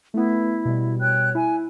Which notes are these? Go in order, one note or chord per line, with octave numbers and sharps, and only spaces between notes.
A3 B3 E4
B2 G3
C#5 G5 F#6
E4 G#5